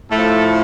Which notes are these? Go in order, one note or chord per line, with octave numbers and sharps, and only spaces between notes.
A2 F3 A3 A4